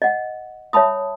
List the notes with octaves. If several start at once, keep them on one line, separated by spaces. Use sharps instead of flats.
D#5 F#5
C#5 E5 A5 B5 D#6